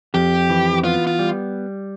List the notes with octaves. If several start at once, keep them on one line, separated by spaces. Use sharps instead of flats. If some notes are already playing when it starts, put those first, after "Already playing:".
F2 G4
E3
B3 F4
F4
G3